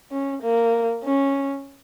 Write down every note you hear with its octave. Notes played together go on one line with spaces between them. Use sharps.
C#4
A#3
C#4